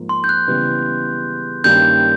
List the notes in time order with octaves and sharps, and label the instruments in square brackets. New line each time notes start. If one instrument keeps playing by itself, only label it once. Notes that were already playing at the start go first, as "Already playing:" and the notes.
Already playing: [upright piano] G#2 F3 A#3
[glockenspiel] C6
G6
F#6
[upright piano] C#3 E3 G3 B3
[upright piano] G2 D#3 G3 A#3 C#4 [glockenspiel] G6